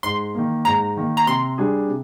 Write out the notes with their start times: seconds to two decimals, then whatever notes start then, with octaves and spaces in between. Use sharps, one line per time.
0.03 G#2 C6
0.35 D#3 A#3
0.65 G#2 A#5
0.97 D#3 A#3
1.17 A#5
1.27 C3 C6
1.58 G3 D4 G#4
1.88 C3